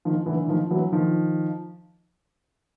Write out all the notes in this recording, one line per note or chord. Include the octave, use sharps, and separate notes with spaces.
D#3 F3
D3 E3
E3
D#3 F3
E3 F#3
D#3 F3